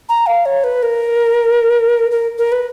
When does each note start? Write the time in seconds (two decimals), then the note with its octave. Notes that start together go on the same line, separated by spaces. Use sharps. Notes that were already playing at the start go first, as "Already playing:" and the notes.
0.09 A#5
0.27 F5
0.45 C#5
0.64 B4
0.83 A#4
2.11 A#4
2.38 A#4
2.52 B4